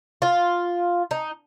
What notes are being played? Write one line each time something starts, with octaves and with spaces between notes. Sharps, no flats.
F4
D#4